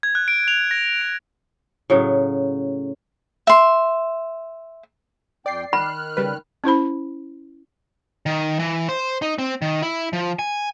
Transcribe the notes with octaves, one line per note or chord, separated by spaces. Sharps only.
G#6
F#6
D7
F7
A#6
D7
A2 C#3 F#3
E5 C6
F2 D5 G5 C7
D#3 B5 F6 F#6
C#3 G3 B4
C#4 E4 C5 B5
D#3
E3
C5
D#4
C4
D#3
E4
F3
G#5